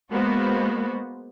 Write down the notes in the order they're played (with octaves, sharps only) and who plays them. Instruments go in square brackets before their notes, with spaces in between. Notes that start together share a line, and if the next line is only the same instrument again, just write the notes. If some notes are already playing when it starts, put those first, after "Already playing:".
[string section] G#3 A#3 B3 F#4 C5